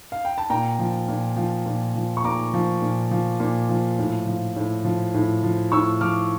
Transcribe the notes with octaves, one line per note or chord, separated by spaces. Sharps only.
F5
G5
A5
A#2 G5 A#5
F3
A#2
F3
A#2
F3
C#6
A#2 A#5 D6
F3
A#2
F3
A#2
F3
A2
F3
A2
F3
A2
F3
A2 C#6 E6
F3 D6 F6